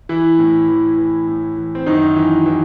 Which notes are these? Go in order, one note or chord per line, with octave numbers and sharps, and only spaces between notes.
E3 E4
A2
E3
E3
A2
E3
C4
F#2 D#3 D#4
E3
E3